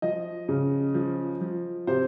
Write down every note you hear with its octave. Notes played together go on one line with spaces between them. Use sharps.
F3 D#5
C#3
F3
F3
C3 C5